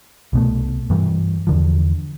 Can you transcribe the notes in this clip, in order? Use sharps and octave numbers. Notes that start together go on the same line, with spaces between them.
C2 B2 A3
G2 E3 G3
E2 D3 F3